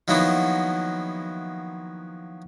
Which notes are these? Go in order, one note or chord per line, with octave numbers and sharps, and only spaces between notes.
D#3 F3 F#3 A#3 B3 E4